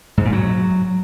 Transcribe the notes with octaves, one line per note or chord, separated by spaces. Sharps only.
G#2
A#2
F#3